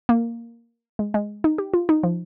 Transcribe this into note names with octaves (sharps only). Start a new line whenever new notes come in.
A#3
G#3
G#3
D#4
G4
F4
D#4
F3